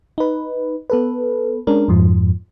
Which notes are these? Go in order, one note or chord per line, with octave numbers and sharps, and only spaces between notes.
D#4 B4
B3 A4 B4
G#3 C#4 D4 A#4
F2 G#2 F3